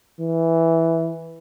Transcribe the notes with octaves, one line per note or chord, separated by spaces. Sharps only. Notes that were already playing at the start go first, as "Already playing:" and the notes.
E3